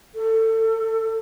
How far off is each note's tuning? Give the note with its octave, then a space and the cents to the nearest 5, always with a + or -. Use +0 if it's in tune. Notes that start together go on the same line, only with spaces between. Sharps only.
A4 +25